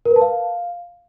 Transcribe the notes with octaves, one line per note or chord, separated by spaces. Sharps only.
A#4
B4
A5
F5